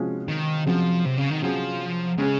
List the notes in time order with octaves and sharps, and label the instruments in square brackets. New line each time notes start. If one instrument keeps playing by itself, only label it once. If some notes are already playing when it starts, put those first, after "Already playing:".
Already playing: [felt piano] C3 F3 G#3 C#4 F#4
[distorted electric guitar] D#3
[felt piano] C3 F#3 C#4 G#4 [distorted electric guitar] F3
[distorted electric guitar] C3
C#3
D#3
[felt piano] C3 F#3 C#4 G#4 [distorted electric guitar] F3
[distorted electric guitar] C#3 [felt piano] G#3 C#4 G#4